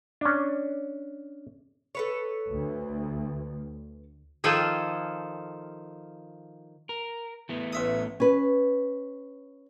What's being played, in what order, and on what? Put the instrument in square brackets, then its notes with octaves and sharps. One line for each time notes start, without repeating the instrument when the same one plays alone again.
[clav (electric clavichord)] C#4 D4
[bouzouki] A4 B4 C#5
[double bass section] D2
[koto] D#3 F3 F4 A4 G5 G#5
[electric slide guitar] A#4
E3 A3 B3
[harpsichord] A1 E5 D#6
[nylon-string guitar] C#4 B4